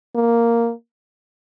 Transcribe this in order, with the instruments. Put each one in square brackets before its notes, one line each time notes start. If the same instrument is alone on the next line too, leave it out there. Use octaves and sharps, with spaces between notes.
[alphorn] A#3